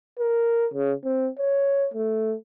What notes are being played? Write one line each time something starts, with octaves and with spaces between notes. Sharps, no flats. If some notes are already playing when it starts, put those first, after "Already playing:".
A#4
C#3
C4
C#5
A3